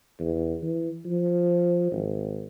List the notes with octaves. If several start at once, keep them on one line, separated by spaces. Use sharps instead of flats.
E2
E3
F3
G#1